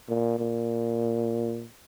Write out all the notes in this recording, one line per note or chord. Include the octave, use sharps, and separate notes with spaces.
A#2
A#2